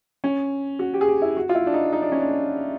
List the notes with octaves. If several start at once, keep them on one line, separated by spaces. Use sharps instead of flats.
C#4
F#4
G4
G#4
G4
E4
F#4
F4
E4
D4
D#4
D#4
D4
C#4
D4